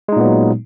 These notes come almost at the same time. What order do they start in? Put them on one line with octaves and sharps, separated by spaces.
G#3 D#4 A#2 B3 F#3